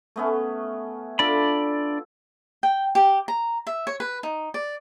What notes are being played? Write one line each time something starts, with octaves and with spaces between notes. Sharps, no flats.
A3 B3 C#4
D4 F4 A4 D5 B5
G5
G4
A#5
E5
C#5
B4
D#4
D5